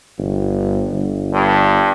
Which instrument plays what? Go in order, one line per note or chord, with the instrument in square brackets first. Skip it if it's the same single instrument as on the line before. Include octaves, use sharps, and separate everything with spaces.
[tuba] G1
G1
[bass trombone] G2